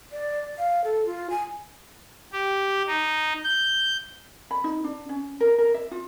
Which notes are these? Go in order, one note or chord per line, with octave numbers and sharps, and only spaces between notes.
D5
F5
A4
F4
G#5
G4
D#4
G6
B5
D#4
D4
C#4
A#4
A#4
E5
F4